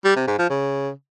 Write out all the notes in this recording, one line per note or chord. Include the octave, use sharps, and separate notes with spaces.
G3
C3
G#2
F3
C#3